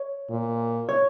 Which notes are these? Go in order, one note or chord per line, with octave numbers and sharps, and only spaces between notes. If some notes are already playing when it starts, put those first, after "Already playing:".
Already playing: C#5
A#2
C#5